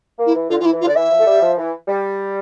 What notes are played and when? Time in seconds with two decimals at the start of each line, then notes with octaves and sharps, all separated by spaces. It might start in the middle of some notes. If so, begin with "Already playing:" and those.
0.19 A#3
0.26 E4
0.34 E3
0.50 D3 F4
0.60 E3 F4
0.65 E4
0.73 E3
0.81 F4
0.84 D3 D5
0.96 E3 E5
1.11 F3
1.19 A3
1.26 G3
1.42 F3
1.57 E3
1.88 G3